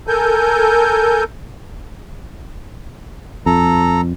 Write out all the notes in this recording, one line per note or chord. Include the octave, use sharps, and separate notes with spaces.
A4 A#4 G#5 G6
F2 A4 A#5